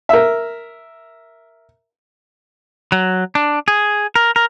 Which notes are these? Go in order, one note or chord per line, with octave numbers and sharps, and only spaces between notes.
A#4 E5
F#3
D4
G#4
A#4
A#4